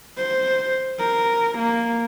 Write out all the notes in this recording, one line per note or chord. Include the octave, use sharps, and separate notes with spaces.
C5
A#4
A#3